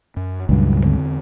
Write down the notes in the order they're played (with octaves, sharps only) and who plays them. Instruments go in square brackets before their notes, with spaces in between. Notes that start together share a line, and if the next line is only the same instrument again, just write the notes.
[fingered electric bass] F#2
[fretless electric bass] C#2 G2 [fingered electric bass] A#2 F#3
[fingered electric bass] E2 D3 C4